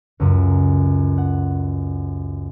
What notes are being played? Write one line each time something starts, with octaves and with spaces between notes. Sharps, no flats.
C#2 F#2
F#5